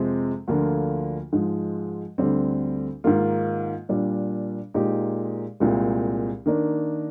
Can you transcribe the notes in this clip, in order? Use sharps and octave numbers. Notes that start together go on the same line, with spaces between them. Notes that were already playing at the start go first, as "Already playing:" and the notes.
Already playing: F2 C3 F3 G#3 C4
D2 D3 F3 A#3 F4
G#2 F3 G#3
D2 D3 G3 C4
G#2 D#3 A#3 F4
A#2 G3 D4
A#2 G#3 D#4 G4
C2 A#2 G#3
D#3 A#3 D4